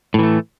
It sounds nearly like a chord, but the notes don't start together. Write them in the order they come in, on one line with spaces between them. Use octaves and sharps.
A2 E3 A3